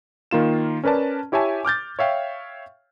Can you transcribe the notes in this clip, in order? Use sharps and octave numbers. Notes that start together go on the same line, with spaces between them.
D#3 A#3 F4 E7
C#4 A#4 B4 D5 A5
E4 G4 C#5 E5 G#5 A5
D6 F6 G6 A6
C#5 E5 F5 G5